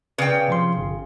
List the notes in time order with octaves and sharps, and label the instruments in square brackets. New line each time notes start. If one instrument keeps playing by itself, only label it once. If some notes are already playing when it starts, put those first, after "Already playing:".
[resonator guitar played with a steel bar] C#3 G5 [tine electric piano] B4 D5
[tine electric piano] C3 F3 C6
G1